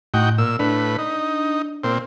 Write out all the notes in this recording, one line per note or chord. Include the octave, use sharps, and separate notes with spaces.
A2 D#4 F#4 G5
A#2 E6
A2 D4 B4
D#4
A#2 C4